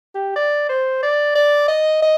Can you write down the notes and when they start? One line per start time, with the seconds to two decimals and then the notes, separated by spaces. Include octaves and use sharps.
0.15 G4
0.36 D5
0.69 C5
1.03 D5
1.35 D5
1.68 D#5
2.02 D#5